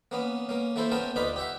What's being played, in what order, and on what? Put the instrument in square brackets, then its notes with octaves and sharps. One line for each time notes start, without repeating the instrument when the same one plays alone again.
[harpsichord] A#3 B3 C#4
A#3 C#4
A3 A#3 E4 A4 C5
B3 C#4 A#4 G5 A5
D2 D#4 F4 B4 D5 B5
G4 E5 F#5